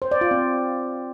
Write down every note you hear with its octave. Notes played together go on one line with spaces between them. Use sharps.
C5
D5
F4
C4